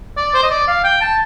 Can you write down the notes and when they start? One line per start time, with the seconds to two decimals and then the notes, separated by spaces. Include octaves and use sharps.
0.17 D5
0.34 C5
0.43 D#5
0.50 D5
0.68 F5
0.84 G5
1.01 A5